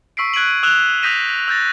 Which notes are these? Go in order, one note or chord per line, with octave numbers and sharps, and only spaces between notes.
C#6 E6 B6 C7 D7
F#6 G#6 D7 D#7 F#7
D#6 E6 F#6 E7 F7 G7
D#6 G6 A#6 B6 D#7 E7
E6 G6 A6 A#6